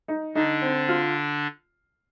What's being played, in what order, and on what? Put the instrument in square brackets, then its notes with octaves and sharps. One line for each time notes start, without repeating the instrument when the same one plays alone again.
[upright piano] D#4
[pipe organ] D3 D4 [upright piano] D#4
[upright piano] C4
F4